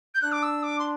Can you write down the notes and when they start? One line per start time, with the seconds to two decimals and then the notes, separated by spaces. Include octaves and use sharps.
0.15 G6
0.21 D4 F#6
0.32 D6
0.43 E6
0.63 D6
0.79 C6